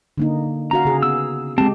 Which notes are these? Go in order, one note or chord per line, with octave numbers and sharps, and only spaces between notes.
D3 A#3 D#4
C#4 F#4 F5 A#5
C#3 G#4
B3 E6
G#3 C4 G4 A5